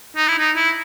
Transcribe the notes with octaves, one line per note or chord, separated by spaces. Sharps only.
D#4
E4
D#4
E4